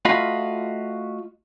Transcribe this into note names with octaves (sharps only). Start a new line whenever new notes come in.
A3 F4 F#4 D#5 F5 B5